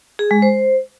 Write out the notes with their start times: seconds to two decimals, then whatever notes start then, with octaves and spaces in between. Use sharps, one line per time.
0.19 G#4
0.31 G#3
0.42 C5